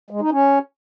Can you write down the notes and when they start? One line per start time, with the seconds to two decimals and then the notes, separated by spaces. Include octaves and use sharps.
0.10 G#3
0.21 D#4
0.31 C#4